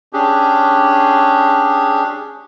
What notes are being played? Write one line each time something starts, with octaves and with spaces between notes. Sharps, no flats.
C#4 D4 G4 G#4